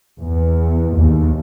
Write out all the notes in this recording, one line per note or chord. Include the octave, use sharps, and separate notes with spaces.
E2
D#2